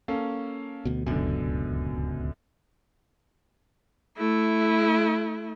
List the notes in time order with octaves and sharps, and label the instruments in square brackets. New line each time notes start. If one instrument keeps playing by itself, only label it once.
[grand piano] A#3 C#4 A4
[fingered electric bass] D2 B2
[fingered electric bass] D1 C#2 B2 [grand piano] F#2 D3
[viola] A3 E4